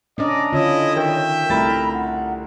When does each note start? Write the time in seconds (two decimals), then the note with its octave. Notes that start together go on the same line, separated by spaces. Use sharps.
0.18 C#4 D4 A#4 D5 D#5
0.53 D3 C#4 E4 F4 C#5 D#5
0.96 D#3 E5 G5
1.50 C2 A3 E4 A#4 B5 A6
1.93 F#5